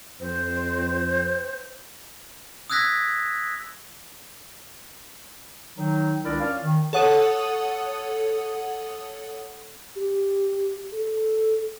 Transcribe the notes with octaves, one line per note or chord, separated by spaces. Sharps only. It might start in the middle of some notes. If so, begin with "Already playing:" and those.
F2 C5
D#6 E6 F#6 G#6 A#6 B6
D#3 F#3 D#4
C#2 D#3 D4 E4 A#4 D5
C#4 F4 D5 F5
D#3
A4 C#5 F#5 D#6 D#7
G4
A4